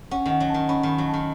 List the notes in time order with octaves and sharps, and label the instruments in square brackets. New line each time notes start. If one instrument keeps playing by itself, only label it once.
[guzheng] C#4 [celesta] F#5
[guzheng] D#3
[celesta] F#5
[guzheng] F#3
[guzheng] D#3 [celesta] A5
[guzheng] C#4 [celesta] B5
[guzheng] D#3
[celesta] B5
[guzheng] F#3
[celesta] A5
[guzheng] D#3